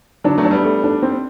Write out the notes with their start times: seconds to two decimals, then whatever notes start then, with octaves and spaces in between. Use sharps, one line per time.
0.24 D3 F#3 D4
0.38 F#3 A3
0.45 D4
0.51 G3 B3
0.65 A3
0.84 D4
1.03 C4